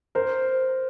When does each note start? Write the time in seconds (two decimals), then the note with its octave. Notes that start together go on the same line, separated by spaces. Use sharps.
0.15 A#4 C5